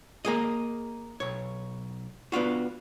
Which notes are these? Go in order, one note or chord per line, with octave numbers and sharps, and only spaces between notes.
A#3 G#4 D#5
B1 C#5
B3 D4 F4 F#4